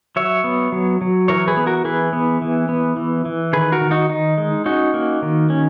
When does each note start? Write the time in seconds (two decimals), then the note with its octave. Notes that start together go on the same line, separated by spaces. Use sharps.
0.16 F#3 C#5 E5
0.44 B3
0.72 F#3
1.01 F#3
1.28 E3 A#4 C#5
1.48 G#4 B4
1.57 B3
1.67 F#4 A#4
1.85 E3 G#4 B4
2.13 B3
2.42 E3
2.69 B3
2.97 E3
3.25 E3
3.53 D#3 G#4 B4
3.72 F#4 A#4
3.81 D#3
3.91 D#4 F#4
4.10 D#3 D#4
4.38 G#3
4.66 C#4 D#4 F#4
4.94 A#3
5.22 D#3
5.50 C#4